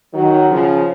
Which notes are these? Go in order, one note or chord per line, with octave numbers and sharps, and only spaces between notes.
D#3 F#3
C#3 F3